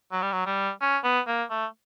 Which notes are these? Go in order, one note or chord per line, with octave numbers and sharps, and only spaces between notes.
F#3
G3
F#3
G3
C#4
B3
A#3
A3